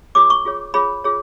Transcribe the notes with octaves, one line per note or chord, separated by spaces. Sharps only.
F4 G#4 C#5 D6
C#6
F4 G#4 C#5
F4 G#4 C#5 B5
F4 G#4 C#5